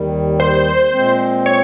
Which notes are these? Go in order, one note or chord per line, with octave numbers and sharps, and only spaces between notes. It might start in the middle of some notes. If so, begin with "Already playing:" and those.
Already playing: D#2 D#3 G3
C5
A#2 G#3 C4
C#5